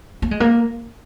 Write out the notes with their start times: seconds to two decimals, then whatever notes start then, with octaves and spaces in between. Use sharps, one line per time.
0.22 A#3
0.31 G#3
0.40 A#3